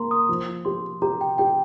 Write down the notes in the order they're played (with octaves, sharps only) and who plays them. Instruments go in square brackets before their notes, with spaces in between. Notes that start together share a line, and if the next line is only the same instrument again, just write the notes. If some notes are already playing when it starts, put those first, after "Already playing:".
Already playing: [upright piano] A#3 [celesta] A#5 C6
[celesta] D#6
[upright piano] F3
[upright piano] G4 [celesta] C6
[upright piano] G4 [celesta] A#5
[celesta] G5
[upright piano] G4 [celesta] G5